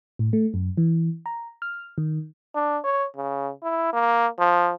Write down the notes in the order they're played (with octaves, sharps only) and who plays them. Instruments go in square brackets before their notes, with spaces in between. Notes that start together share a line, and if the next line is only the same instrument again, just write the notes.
[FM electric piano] A2
A3
F#2
E3
A#5
F6
D#3
[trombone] D4
C#5
C#3
E4
A#3
F3